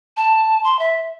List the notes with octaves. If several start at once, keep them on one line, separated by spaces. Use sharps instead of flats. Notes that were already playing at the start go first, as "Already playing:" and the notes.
A5
C6
E5